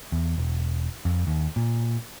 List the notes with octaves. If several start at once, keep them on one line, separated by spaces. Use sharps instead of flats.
E2
E1
F2
D#2
A#2